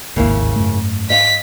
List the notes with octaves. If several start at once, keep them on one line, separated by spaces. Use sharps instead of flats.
D1 G#1 D#2 G#2 C#3 A#3 E4
F#2 A3
D#5 F5 B6